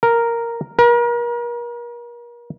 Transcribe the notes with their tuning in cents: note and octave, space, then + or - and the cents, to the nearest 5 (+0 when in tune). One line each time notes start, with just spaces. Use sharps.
A#4 +0
A#4 +40